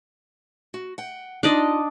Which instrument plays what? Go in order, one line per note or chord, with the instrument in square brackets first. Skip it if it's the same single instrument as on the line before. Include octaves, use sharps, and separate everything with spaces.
[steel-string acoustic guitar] F#4
F#5 G5
[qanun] D4 D5 D#5 [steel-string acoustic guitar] D#4 F4